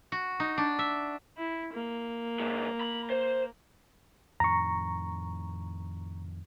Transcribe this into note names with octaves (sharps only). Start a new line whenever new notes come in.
F#4
D#4
D4
E5
E4
A#3
A#2 G#3
B5
C5
F2 A2 D#3 A#5 C#6